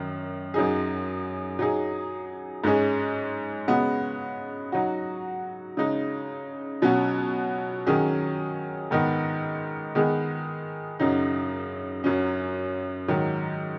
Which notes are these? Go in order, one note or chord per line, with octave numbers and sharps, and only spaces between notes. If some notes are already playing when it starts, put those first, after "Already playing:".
Already playing: F#2 D#3
F#2 F#3 D#4 G#4
F#3 D#4 G#4
G#2 G#3 C#4 G#4
C#3 G#3 B3 F#4
F#3 D#4 F#4
C#3 G#3 D#4
B2 F#3 C#4 F#4
D#3 F#3 C#4 G#4
G#2 D#3 B3 D#4
D#3 G#3 B3 G#4
F#2 C#3 F#3 D#4
F#2 F#3 C#4
G#2 D#3 F#3